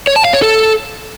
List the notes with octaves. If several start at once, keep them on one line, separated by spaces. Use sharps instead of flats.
C#5
A5
F5
C#5
A4